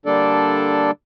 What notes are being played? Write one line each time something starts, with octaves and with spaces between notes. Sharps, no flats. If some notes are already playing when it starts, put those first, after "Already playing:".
D3 G3 A#3 D4 A4 D5